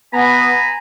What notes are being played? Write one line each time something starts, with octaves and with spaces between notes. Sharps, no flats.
B3 G#5 A#5 B5